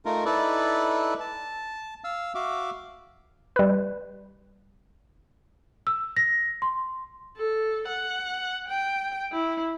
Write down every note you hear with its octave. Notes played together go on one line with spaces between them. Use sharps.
A3 D#4 F4 A#4
D#4 E4 A4 B4 D5
A5
F5 E6
F#4 E5 F5 D6
G3 B4
E6
A#6
C6
A4
F#5
G5
E4